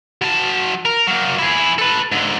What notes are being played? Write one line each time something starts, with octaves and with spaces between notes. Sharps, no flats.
F#3 A5
A#4
F#3 A#3
E4 G#4
A4 B4
G#2 D3